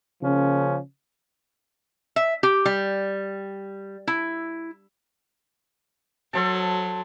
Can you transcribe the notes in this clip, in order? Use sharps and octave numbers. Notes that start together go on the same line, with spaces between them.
C#3 F3 A#3 C#4
E5
G4
G3
E4
F#3 A4 C5 A5